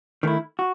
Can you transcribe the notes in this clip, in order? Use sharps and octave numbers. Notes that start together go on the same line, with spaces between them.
D#3 A3 E4
F#4